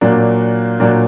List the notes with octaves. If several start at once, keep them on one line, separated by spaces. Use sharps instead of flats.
A#2 F#3 A#3 D4
A#2 F#3 A#3 D4